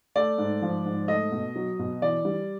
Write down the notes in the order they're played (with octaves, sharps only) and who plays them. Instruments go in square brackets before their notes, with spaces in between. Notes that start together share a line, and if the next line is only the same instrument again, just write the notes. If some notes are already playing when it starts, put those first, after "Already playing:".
[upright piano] A3 D5
G#2
F3
G#2
A3 D#5
B2
F#3
B2
E3 D5
G3